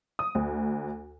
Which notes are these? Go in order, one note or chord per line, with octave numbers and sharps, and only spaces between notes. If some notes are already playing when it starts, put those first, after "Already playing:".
D#6
D2